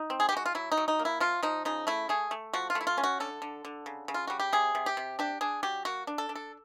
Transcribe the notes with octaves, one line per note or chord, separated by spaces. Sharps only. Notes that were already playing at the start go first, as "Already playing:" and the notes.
Already playing: D#4
C4
G#4
G4
G#3 F#4
F4
F#3 E4
D#4
F#3
D#4
A#3
E4
F3 F4
F3 D#4
C#3 D#4
A3 E4
A3 G#4
A3
F3 F#4
F4
A3
E4
F4
C#4
F#4
D3 A4
D3
D3
C#3
C#3
F4
G3 F#4
G4
C3 G#4
C3
G4
C3
D4 G4
D4 G#4
F#3 G4
A#3 F#4
D4
A4
D4
A4